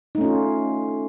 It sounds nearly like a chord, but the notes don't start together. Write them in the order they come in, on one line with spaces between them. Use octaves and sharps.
D#4 A3 C#4 F4